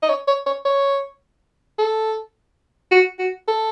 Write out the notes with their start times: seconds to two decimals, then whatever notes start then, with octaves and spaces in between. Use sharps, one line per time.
0.02 D#5
0.09 C#5
0.28 C#5
0.46 C#5
0.65 C#5
1.79 A4
2.91 F#4
3.19 F#4
3.48 A4